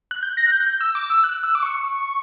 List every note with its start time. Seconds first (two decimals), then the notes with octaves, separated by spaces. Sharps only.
0.11 F#6
0.23 G6
0.37 A#6
0.46 F#6
0.52 G6
0.67 G6
0.81 E6
0.95 D6
1.10 E6
1.24 F#6
1.43 E6
1.55 D6
1.63 C#6